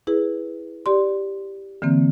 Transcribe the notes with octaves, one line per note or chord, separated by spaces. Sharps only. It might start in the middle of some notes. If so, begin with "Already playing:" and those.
E4 G#4 B4
G4 D5 C6
D3 E3 A#3 C4